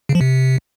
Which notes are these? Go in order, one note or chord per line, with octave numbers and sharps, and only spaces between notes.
C#3
F3
C3